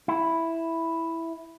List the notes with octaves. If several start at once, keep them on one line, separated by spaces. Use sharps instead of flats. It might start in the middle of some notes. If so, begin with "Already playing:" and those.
E4